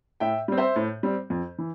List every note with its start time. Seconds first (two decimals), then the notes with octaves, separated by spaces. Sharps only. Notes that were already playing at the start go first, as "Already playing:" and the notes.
0.20 A2 E5 G5
0.48 G3 C4
0.58 C5 E5
0.76 A2
1.03 G3 C4
1.30 F2
1.58 E3